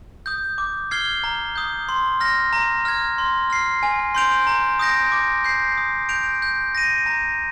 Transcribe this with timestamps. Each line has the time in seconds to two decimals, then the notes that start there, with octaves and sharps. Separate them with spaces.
0.26 D#6 G6
0.58 D6
0.91 F6 G#6 C7 G7
1.24 A#5
1.56 D#6 G6
1.89 C6
2.20 F6 A#6
2.53 A#5
2.85 F6 G#6
3.18 C6
3.50 F6 C7
3.83 G#5
4.15 C6 G6 D7 F7
4.47 A#5
4.79 D#6 G6 A#6 D7
5.12 D6
5.44 G6 C7
5.77 D#6
6.09 G6 D7 F7
6.42 G6
6.75 A#6 D#7
7.06 A#5